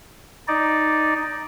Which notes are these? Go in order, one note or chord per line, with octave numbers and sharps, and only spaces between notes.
D#4 D5